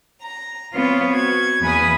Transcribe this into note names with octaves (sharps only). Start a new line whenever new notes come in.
A#5
B3 C4 F4 B4 C#5
F#4 G#6
E2 A#3 B4 G#5 B5 D#6